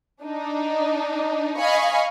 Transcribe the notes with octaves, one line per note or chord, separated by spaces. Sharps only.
D4 D#4
D#5 F5 G#5 B5 C#6